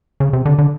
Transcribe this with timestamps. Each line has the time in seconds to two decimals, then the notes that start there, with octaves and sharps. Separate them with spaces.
0.20 C#3
0.33 C3
0.46 D3
0.59 D3